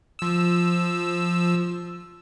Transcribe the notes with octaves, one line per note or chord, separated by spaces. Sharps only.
F3 E6